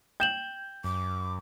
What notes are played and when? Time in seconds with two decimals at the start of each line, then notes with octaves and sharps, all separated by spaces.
0.20 G5 G6 E7 F#7
0.84 F#2 D6